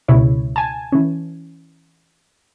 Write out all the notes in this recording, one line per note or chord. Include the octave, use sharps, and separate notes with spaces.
C#2 B2 E4 C#5
G#5 A5
E3 C#4